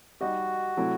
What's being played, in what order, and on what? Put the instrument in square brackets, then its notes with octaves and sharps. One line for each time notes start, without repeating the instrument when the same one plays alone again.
[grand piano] G3 D#4 G4 D#5 [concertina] F#4
[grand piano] C3 F#3 A3 E4